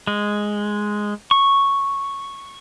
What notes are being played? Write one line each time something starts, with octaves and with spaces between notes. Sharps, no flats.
G#3
C#6